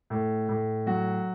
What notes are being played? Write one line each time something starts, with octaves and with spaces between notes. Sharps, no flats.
A2
A2
F#3 F#4